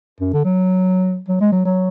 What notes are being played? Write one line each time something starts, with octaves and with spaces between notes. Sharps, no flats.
F#2
D3
F#3
F#3
G#3
F#3
F#3